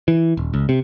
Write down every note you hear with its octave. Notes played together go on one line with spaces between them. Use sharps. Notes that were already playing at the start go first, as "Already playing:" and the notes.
E3
D#1
C#2
C3